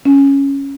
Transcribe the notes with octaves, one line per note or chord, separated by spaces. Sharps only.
C#4